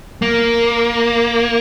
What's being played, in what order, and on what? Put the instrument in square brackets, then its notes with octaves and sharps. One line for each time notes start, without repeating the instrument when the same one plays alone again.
[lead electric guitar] A#3